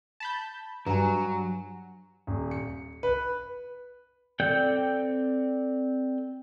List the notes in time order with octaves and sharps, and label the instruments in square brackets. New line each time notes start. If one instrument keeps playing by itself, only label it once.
[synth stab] A5 B5 G6
[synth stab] G2 [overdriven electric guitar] F#3 [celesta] G#5 A#5
[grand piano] D#1
C#7
B4
[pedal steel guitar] C4 A4 D5 G5 G6